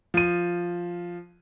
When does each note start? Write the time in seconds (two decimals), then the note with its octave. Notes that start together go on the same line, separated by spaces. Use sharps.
0.14 F3 D#7